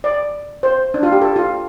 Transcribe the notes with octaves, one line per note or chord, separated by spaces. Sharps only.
D5
C5
D4
F4
G4
A4
F4